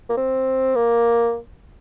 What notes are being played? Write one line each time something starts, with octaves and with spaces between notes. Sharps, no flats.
A#3
C4
A#3